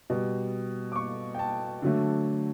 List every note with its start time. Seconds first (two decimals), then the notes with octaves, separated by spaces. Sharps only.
0.10 B2 G3
0.92 D6
0.96 C#6
1.35 G5
1.39 A5
1.82 D3 F#3 A3